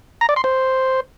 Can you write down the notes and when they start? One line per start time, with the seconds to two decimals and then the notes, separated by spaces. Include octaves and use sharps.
0.21 A#5
0.29 D5
0.36 C6
0.44 C5